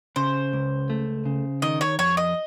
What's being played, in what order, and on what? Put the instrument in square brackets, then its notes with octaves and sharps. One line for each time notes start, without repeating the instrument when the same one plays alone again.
[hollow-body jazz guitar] C#3 [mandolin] C5
[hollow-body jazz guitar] C#2
A3
C#3
[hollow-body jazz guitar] D#3 [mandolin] D#5
[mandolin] C#5
[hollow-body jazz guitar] F2 [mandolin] C#5
[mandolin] D#5